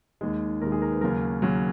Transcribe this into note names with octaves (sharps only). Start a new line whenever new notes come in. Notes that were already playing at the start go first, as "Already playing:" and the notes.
D#2 D#3 G#3
D#2 D#3 G#3 A#4
G#4
A#4
B4
D#2 C#3 F#3 A#4
D#2 C#3 F#3